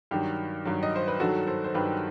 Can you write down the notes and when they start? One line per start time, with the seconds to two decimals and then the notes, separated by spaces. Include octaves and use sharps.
0.11 G2 D#3 F#3 G4
0.65 G2 D#3 F#3
0.83 D#5
0.96 C5
1.08 B4
1.20 G2 D#3 F#3 F#4 A4
1.48 A4 C5
1.64 C5
1.74 G2 D#3 F#3 G4 B4